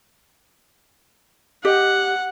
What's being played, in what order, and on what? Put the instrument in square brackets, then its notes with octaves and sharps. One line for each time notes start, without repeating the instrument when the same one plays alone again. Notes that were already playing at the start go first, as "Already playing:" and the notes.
[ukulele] G4 D#5 [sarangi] F#5